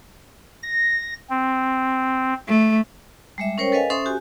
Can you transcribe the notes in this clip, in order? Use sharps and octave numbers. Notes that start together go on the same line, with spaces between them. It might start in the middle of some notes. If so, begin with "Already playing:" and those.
A#6
C4
A3
G3 G#3 E5
C#4 A#4 C5 C#5 G5
A4 B4 D#5 F5 G#5
C#4 A4 C5 E5 C6 D#6
F#4 G4 G#5